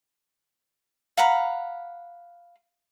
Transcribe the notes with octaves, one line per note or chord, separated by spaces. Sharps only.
F5 F#5 A#5 B5